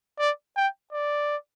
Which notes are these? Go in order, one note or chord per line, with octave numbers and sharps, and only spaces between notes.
D5
G5
D5